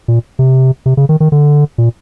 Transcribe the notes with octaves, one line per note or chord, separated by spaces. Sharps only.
A#2
C3
C3
C#3
D#3
D#3
D3
A#2